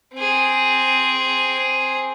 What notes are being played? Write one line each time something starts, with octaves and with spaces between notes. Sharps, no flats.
C4 G#4